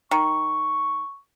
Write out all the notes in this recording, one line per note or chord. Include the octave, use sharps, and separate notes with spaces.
D#3 C#6